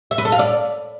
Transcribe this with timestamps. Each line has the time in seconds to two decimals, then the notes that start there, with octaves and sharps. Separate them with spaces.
0.11 E5
0.18 B4
0.25 A4
0.32 F5
0.39 D5